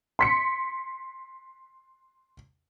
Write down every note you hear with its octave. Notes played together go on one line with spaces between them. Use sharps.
C6 B6 C#7